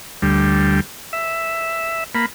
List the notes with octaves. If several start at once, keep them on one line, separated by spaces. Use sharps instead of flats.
D2 G3
E5
A#3 B5